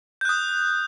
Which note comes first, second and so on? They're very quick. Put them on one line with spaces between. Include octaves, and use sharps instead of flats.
G6 F#6 D#6